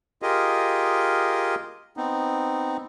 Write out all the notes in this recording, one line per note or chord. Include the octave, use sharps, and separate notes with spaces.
F4 G4 G#4 A#4 D#5
B3 C4 D#4